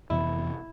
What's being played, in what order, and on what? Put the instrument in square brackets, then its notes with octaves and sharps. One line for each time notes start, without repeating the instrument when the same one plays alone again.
[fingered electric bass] F2 C3 E3 B3 [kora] E4